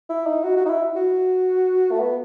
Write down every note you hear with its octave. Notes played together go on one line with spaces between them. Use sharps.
E4
D#4
F#4
F#4
D#4
E4
F#4
A3
B3